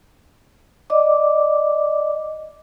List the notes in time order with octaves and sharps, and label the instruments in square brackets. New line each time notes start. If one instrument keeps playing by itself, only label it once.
[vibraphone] D5 D#5 D6